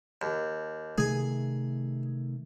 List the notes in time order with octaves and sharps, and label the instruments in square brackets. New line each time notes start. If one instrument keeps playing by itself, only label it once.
[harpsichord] D#2
[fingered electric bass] C3 D#3 A3 [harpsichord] G#4 G#5